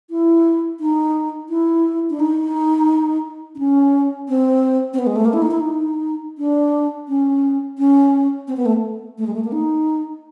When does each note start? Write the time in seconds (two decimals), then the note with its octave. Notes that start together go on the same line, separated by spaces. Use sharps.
0.10 E4
0.80 D#4
1.49 E4
2.10 D4
2.20 D#4
3.55 D4
3.58 C#4
4.29 C4
4.93 C4
4.99 B3
5.07 G#3
5.16 A3
5.25 A#3
5.33 E4
5.42 D#4
5.51 E4
5.60 D#4
6.38 D4
7.08 C#4
7.78 C#4
8.48 C4
8.57 B3
8.66 A3
9.18 A3
9.27 G#3
9.34 A3
9.44 A#3
9.52 D#4